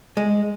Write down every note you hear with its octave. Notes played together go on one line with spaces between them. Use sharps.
G#3